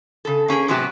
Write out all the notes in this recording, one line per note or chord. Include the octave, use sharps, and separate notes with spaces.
C#3 A4
A#3 C#4 G#4 A#4
G#2 C3 F#3 B3 F#4 G4